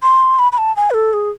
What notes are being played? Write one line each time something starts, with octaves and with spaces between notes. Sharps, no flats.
C6
B5
B5
A5
G#5
B4
A4
G#4